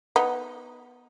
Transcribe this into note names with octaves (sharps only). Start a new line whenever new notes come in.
B3 D#4